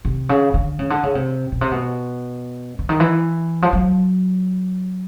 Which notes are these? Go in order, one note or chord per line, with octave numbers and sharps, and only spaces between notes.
C3
C#3
D3
C#3
D3
C#3
C3
B2
C3
B2
D3
D#3
E3
F3
F#3